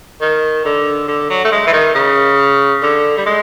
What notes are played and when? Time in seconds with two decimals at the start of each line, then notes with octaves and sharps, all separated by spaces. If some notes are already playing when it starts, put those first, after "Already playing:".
0.21 D#3
0.65 D3
1.08 D3
1.30 F#3
1.45 A3
1.52 G#3
1.67 E3
1.73 D#3
1.95 C#3
2.82 D3
3.17 G3
3.26 G#3